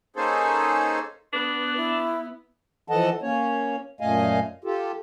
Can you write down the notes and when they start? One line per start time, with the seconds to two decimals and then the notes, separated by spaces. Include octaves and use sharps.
0.16 A#3 C#4 D#4 G#4 A4 C5
1.33 B3 D4 B4
1.77 E4
2.88 E3 F3 A4 D#5 F#5 A5
3.22 A#3 C#4 C#5
4.01 F#2 A#2 A3 D#5 F5 G#5
4.64 F4 G4 A4